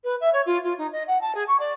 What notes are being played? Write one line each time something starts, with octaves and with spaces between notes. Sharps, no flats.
B4
E5
C#5
F4
F4
D#4
D#5
F#5
A5
G#4
C#6
D5